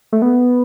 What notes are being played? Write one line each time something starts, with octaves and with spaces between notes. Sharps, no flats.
A3
B3